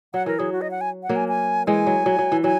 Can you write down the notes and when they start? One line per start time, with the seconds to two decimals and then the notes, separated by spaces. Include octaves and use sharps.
0.14 F#3 F#5
0.26 E3 A#4
0.39 F#3 G#4
0.52 F#4
0.61 D#5
0.71 F#5
0.81 G#5
1.03 F#5
1.09 F#3 A#3
1.16 G#5
1.28 G#5
1.67 E3 G#3 G#5
1.87 F#3
2.06 F#3
2.19 F#3
2.32 E3
2.44 F#3 G#5